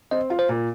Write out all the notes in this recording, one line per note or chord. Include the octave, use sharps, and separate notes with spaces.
C4 D#5
F4
C5
A#2